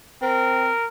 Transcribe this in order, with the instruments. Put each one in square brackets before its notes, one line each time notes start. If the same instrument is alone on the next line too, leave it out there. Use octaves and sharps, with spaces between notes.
[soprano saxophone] C4 [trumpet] A#4